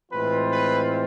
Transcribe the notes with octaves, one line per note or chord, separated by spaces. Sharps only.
A2 E3 G#3 C4 F4 B4
B4